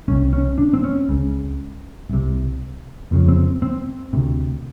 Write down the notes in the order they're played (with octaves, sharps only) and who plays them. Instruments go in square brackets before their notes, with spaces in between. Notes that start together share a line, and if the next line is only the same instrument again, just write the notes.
[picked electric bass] C2 C3 C#4
C#4
D4
C4
C#4
C#2 C#3
C2 C3
F1 F2 C#3
C4
C4
D2 C3